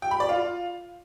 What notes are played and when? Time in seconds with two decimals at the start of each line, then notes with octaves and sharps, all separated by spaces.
0.02 G5
0.11 B5
0.20 D5
0.29 F4